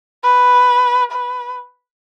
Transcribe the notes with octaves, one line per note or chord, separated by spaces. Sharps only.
B4
B4